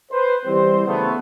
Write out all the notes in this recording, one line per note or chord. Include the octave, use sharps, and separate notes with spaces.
B4 C5
E3 G3 C4 C5
C#3 A3 B3